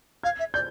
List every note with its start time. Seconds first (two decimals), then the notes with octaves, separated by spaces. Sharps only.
0.23 F5 G#6
0.39 E5
0.54 D5 G6